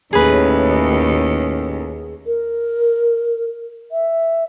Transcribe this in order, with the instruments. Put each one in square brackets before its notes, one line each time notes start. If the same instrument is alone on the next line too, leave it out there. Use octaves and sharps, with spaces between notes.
[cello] D#2 [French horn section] A2 C#4 [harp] G#4 B4
[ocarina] A#4
E5